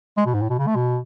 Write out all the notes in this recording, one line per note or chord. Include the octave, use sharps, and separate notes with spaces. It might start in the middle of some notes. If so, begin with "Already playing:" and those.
G#3
B2
G#2
A2
B2
C#3
A3
B2